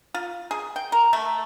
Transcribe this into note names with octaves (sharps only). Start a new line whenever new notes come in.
F4
G#4
G5
A#4
A3